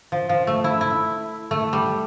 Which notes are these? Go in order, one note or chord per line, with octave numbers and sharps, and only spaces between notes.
F3
F3
A3
E4
E4
A3
G3